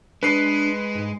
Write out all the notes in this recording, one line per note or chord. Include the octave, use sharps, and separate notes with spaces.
G#3 D4 B4 C7
G#2